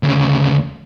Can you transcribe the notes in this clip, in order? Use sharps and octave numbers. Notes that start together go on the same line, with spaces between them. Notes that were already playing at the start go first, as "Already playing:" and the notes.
D2 C#3